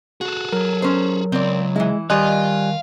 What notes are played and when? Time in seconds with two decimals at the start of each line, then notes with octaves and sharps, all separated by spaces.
0.21 F#4 G#4 A4
0.53 F#3 A#4
0.82 C#4 C5
1.32 C#2 C4 D5
1.76 E3 G#3 E4
2.10 D#3 G3 D#5 F5 G#5 C6 F#6